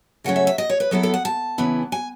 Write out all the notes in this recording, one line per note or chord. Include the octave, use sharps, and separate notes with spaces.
C#3 F#3 A3 C#4 F#5
E5
E5
D#5
C#5
B4
F#3 B3 E4 A4
A4
F#5
A5
C#3 E3 B3 E4
G#5